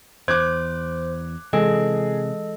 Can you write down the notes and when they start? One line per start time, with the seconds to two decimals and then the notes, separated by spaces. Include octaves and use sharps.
0.28 E2 C5 D6 F#6 G#6
1.53 C3 E3 G#3 G#4 A4 D#5